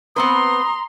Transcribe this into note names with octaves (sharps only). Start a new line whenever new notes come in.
B3 C4 B4 A#5 C6 D#6